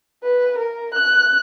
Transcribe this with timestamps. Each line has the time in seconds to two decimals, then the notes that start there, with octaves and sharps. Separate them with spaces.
0.23 B4
0.57 A#4
0.94 F#6